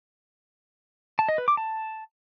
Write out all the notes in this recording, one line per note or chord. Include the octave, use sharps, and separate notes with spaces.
A5
D#5
B4
D6
A5